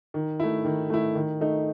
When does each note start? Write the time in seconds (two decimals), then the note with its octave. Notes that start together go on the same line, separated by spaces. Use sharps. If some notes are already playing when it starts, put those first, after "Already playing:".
0.14 D#3
0.40 A3 E4
0.65 D#3
0.90 A3 E4
1.15 D#3
1.41 A3 D#4